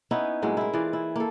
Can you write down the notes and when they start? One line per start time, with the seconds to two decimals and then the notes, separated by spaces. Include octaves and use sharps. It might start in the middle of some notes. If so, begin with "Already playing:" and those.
0.11 B3 C#4 D#4 E4
0.42 A2 F#3 G#3 A#3
0.57 E4 A#4
0.74 E3 F4 G#4 D5
0.93 E4
1.16 A#3 A4